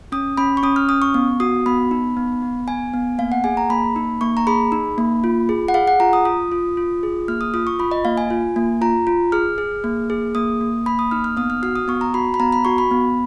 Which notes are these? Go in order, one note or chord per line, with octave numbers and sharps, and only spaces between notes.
C#4 D#6
C#4 B5
C#6
C#4 D#6
F6
C#4 D#6
C#6
B3
F#4 D#6
B3 B5
D#4
B3
B3
B3 G#5
B3
A#3 F5
F#5
G#4 G#5
A#5
A#3 B5
D#4
A#3 C#6
A#5
G#4 B5
D#4
A#3
F4
G#4
F#5
G#4 F5
F#5
F4 A#5
D#6
F4 D#6
F4
F4
G#4
A#3 F6
D#6
F4 D#6
C#6
F4 B5
D#5
A#3 F5
G#5
F4
A#3
F4 A#5
F4
G#4 F6
G#4
A#3
G#4
A#3 D#6
A#3
A#3 B5
D#6
D#4 F6
F6
B3 D#6
F6
F#4 F6
D#6
B3 C#6
A#5
F#4 B5
B5
B3 A#5
B5
F#4 C#6
B5
B3